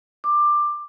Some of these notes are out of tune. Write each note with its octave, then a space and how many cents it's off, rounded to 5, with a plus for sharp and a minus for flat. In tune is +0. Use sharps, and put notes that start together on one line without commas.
D6 +15